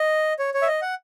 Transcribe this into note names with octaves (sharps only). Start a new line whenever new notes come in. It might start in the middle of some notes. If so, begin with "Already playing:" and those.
Already playing: D#5
C#5
C#5
E5
D#5
F#5